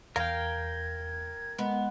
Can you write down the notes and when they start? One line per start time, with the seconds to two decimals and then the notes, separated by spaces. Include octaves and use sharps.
0.16 E2 A#4 F5 G5 G#6
1.59 G#3 B3